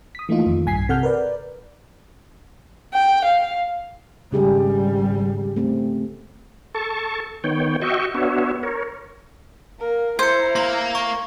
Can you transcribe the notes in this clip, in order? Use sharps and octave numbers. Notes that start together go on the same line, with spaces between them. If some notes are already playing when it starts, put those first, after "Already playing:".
D#6 B6
E3 A3 A#3 D#4 F4
F2 D#3
B1 G2 G#5 G#6 B6 C7
C3 A4 F#5 F6 G6
A#4 B4 D5
G5
F5
G#1 C#3 G3 G4 G#4
A3 C4
A4 A5 C#6
D#3 B3 C#5 G5
F#4 D#5 E5 G5 C#6
B3 D4 F#4 C#5 E5
A#4 C#5
A#3 A#4
E4 C5 A#5 G#6 C#7
A#3 A#4 C6
C#6